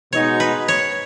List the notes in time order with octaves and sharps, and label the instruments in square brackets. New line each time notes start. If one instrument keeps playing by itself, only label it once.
[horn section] B2 G#3 D#4 F#4 [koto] C#5
[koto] B4
C#5